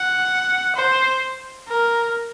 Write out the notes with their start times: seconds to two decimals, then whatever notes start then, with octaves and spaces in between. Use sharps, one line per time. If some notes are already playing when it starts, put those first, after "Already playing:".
Already playing: F#5
0.76 C5
1.69 A#4